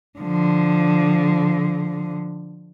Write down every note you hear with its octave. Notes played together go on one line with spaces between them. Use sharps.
D3 F3